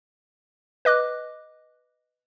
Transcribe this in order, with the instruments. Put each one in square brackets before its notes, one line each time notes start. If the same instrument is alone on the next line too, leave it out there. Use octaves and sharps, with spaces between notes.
[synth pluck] B4 D#5 D6 F#6